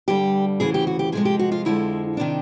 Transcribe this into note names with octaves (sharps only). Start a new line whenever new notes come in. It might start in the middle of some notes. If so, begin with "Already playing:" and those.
G2 D3 G3 G4
D2 C#3 E3 G#4
G4
F#4
G4
F2 C3 F3 G#3 G#4
G4
F#4
F4
F2 D3 F3 G#3 E4
C3 D#3 D4